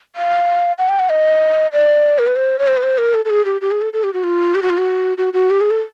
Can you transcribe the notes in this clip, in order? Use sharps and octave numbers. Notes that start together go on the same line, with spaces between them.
F5
F#5
G5
F#5
D#5
D5
A#4
B4
C5
C#5
C5
B4
C5
A#4
A4
A4
G#4
G4
G4
G#4
A4
A4
G4
F#4
F4
G4
F#4
F4
F#4
F#4
F#4
G4
G#4
A4